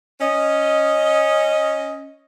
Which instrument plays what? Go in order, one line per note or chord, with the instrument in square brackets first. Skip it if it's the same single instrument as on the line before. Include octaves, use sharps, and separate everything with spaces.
[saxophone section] C#4 D#5